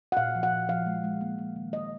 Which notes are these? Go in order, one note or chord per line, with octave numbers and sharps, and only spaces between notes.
F#5
A#2 F5
F3
F#5
A#2
F3 F5
G#3
G#3
A#3
A#3
D#3
A#3 D#5